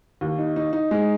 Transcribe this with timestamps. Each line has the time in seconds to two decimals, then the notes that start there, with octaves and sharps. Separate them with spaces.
0.21 D#2
0.38 D#4
0.56 D#4
0.73 D#4
0.91 G#3